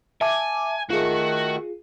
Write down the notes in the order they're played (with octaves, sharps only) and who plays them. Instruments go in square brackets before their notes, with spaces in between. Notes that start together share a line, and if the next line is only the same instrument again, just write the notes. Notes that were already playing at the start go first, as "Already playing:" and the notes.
[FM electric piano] E5 A5 D6 [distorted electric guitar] G#5
[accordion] D#3 A3 [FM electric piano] F4 G#4 [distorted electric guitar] F#4